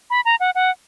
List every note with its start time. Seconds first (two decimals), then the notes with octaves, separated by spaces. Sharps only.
0.10 B5
0.25 A#5
0.40 F#5
0.55 F#5